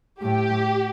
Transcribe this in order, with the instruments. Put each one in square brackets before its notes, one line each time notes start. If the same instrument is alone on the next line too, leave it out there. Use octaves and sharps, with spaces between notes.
[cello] A2 [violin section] G4